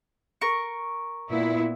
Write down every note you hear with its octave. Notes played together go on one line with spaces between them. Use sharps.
A#4 C#6
A#2 B3 E4